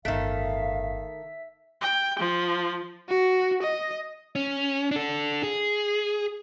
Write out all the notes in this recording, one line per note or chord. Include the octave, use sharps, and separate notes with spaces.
G1 A2 D#3 A3 E5 F5 B6
G5
F3
F#4
D#5
C#4
D4 A4
G#4